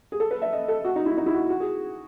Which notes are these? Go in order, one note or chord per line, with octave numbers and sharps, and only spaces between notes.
G#4
A4
B4
E5
D#5
A4
F#4
D#4
E4
D#4
E4
F#4
F#4
G#4